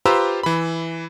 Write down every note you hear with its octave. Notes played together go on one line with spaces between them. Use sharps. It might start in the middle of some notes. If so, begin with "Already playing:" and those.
F4 G4 B4 C5 A#5 E6
E3 B5